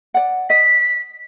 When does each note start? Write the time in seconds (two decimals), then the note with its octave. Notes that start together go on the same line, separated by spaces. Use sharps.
0.14 D5 F#5
0.50 D#5 B6